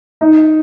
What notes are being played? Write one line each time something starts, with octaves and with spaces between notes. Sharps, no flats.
D#4